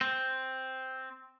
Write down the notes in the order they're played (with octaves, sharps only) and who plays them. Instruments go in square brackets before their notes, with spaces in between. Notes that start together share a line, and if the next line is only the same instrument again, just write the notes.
[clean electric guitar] C4